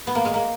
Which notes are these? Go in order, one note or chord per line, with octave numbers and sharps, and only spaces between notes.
B3
A#3
G#3
A#3